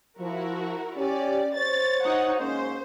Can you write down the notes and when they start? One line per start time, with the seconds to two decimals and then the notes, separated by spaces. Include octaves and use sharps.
0.19 F3 E4 F#4 A#4
0.97 C#4 G4 D5
1.55 C5 C#5 A6
2.04 D#4 F#4 F#5
2.39 G#2 A#3 C#4 C5